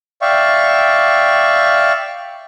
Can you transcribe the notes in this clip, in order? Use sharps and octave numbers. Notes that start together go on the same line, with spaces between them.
D5 E5 F5 G5 C#6